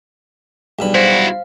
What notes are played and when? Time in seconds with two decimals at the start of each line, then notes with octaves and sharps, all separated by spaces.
0.79 B1 G2 G#4 D5 B5
0.95 E4 F#4 C5 F5